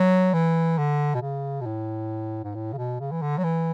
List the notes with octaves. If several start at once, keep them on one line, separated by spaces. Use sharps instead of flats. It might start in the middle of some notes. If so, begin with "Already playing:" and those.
Already playing: F#3
E3
D3
B2
C#3
B2
A2
G#2
A2
C#3
B2
C#3
E3
D3
F#3
E3